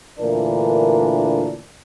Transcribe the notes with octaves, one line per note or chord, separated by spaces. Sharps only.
D2 A#2 E3 D4 A#4